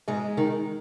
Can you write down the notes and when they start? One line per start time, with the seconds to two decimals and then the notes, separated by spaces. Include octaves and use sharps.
0.08 G#2 G#3
0.37 D#3